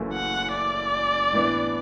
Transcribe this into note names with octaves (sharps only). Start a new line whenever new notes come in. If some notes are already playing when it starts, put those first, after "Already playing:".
Already playing: F#1 F#2 E3 A3
F#5
D5
A2 E3 B3 D4